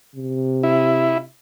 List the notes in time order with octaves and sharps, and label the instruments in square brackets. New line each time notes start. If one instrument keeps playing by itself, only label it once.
[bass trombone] C3
[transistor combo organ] E4